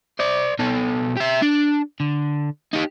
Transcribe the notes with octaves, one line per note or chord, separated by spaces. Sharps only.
C5 D5
B2 A4
G4 E5
D4
D3
D#4 G4